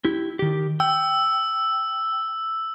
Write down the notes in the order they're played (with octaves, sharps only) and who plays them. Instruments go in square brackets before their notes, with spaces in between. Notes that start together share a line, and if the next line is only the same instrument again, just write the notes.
[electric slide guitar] E4 G4
D#3 G4
[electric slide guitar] G5 [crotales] E6